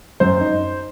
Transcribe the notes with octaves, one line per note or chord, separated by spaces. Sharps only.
F#2 C5
D#4